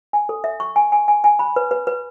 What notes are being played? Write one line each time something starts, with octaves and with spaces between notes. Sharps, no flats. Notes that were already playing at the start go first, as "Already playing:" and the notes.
G#5
A4
E5
C#6
G#5
G#5
G#5
G#5
B5
B4
B4
B4